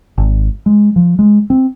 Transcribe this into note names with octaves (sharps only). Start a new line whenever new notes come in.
G#1
G#3
F3
G#3
C4